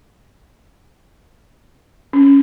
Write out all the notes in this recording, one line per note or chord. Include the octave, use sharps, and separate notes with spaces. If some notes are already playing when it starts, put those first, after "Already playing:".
C#4